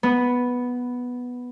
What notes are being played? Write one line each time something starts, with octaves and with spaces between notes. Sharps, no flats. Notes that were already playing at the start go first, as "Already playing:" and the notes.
B3